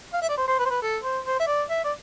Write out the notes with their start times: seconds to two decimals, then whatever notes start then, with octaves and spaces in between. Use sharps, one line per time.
0.13 F5
0.22 E5
0.29 D5
0.37 C5
0.48 C5
0.59 B4
0.65 C5
0.70 B4
0.82 A4
1.03 C5
1.25 C5
1.40 E5
1.47 D5
1.70 E5
1.84 D5